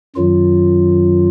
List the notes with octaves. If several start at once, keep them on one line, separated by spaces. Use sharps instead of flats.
F#2 D#3 F#3 F4